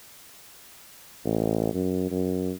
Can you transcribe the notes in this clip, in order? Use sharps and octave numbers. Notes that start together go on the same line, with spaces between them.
A1
F#2
F#2